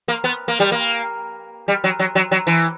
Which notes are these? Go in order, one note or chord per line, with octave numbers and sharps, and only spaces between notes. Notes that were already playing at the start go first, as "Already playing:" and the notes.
A#3
B3
A#3
G3
A#3
G3
F#3
F#3
F#3
F#3
E3